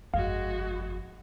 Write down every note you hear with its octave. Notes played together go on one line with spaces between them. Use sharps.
G1 F2 G#3 F#4 F5